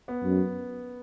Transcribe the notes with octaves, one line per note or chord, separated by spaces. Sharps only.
B3
F#2